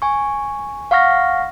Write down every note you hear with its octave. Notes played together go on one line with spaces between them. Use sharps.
G#5 C#6
F5 F#5 C#6 F6 A#6